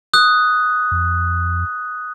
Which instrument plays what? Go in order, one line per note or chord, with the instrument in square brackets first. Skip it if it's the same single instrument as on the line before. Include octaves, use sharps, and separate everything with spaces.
[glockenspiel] D#6 F#6
[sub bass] F2